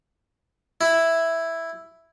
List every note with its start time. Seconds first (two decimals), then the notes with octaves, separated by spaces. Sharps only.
0.81 E4